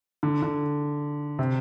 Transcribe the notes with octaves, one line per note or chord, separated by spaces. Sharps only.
D3
D3
C3